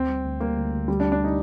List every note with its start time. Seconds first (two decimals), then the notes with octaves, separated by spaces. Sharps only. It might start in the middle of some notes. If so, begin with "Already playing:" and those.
Already playing: D2 C4
0.09 G3
0.25 D2
0.40 G3 A#3
0.56 D2
0.72 D2
0.88 D2 G3
1.00 D4
1.05 G3
1.12 D4
1.20 G3 D#4